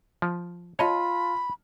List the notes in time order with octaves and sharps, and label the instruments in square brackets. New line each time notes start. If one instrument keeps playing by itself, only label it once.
[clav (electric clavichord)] F3
[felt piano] F4 A5 [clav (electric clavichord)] C#5 D#5 [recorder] B5